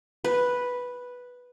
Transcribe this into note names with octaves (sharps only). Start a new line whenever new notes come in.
B4